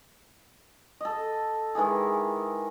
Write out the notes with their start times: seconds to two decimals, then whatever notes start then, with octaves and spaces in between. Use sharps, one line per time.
1.01 A4 D#5
1.75 D#3 E3 G#3 G#4